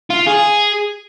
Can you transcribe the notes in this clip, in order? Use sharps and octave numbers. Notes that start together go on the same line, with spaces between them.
F4
G#4